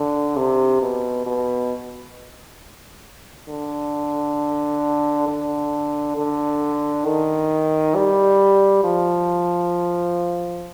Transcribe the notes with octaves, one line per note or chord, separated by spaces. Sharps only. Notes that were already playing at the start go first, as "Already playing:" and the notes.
Already playing: D3
C3
B2
B2
D3
D3
D3
D#3
G3
F3